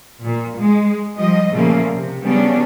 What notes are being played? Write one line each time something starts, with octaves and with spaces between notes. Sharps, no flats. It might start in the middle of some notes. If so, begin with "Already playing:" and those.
A#2
G#3
F3 G3 D#5
A#2 C#3 F3 A3 A#3
C3
C#3 F#3 G3 B3 C#4 D4